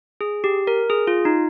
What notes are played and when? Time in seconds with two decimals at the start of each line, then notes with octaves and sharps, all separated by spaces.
0.21 G#4
0.44 G4
0.67 A#4
0.90 G#4
1.07 F4
1.25 D#4